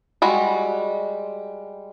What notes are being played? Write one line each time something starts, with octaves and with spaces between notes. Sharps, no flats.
G3 G#3 F#4